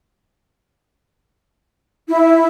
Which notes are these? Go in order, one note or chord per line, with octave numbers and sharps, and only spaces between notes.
E4